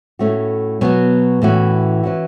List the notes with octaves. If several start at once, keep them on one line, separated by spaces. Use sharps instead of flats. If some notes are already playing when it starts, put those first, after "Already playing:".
A2 A3 C#4 F#4
B2 F#3 B3 F#4
A2 E3 C#4 F#4
E3 C#4 F#4